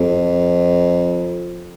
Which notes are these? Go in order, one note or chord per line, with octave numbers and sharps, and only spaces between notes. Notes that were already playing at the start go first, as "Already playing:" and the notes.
Already playing: F2